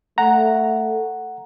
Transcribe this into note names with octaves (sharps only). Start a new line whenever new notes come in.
A3 F#5 A#5